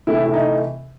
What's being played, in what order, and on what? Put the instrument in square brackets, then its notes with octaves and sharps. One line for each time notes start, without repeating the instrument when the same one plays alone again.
[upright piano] C3 E3 A3 E4
E4
D#4